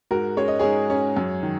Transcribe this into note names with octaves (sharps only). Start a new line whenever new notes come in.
G#2 F#4 A#4
G#3 C#4 C#5
D#5
G#2 G#4 C#5
G#3 C#4
F#2
D#3